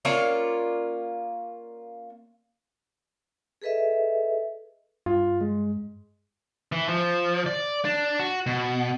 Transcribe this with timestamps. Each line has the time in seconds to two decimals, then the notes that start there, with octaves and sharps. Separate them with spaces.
0.05 A#3 C#4 F4 D5
3.62 G#4 A4 B4 D#5 E5
5.06 G2 F4
5.41 G#3
6.72 E3
6.89 F3
7.46 D5
7.85 D4
8.20 F#4
8.46 B2